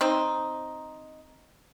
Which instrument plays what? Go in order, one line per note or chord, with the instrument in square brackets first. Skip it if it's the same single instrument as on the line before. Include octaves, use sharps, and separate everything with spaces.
[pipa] C4 D#4